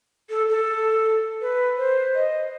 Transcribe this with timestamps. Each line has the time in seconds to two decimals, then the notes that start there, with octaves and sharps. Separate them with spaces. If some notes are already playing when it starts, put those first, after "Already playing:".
0.30 A4
0.49 A4
1.41 B4
1.78 C5
2.15 D#5